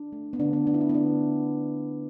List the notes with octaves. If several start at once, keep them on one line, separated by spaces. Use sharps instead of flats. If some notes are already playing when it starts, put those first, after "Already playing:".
Already playing: D4
A3
B3
D3 D4
B3
A3 D4
E4
D4
B3
D3 D4
A3